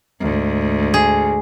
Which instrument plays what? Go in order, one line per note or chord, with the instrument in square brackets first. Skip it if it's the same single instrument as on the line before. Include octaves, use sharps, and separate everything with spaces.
[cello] D2 G#2
[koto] G#4